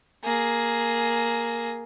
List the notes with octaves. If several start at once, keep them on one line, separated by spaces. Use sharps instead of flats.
A#3 G#4